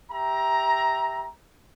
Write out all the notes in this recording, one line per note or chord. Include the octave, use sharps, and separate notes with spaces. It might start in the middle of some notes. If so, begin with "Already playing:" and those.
G4 E5 A#5